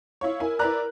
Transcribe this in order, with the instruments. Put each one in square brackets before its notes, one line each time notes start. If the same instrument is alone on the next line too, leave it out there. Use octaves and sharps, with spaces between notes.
[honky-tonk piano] E4 F4 C#5
[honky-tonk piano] E4 G#5 [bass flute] A#4
[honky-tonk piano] E4 B4 D5 [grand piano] A#5 F#6